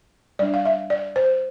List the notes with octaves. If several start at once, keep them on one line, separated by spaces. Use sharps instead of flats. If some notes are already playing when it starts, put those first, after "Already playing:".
G3 D4 D5
F5
E5
D5
C5